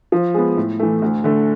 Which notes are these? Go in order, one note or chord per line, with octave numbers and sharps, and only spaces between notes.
F3
G#3 B3
A2
E3 A3
D2
D3 A3